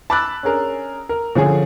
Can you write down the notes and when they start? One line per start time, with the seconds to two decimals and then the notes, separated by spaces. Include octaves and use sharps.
0.10 A5 B5 D6 E6 F#6 A6
0.43 C#4 D4 G#4 A#4
1.09 A#4
1.35 D3 F3 C#4 G#4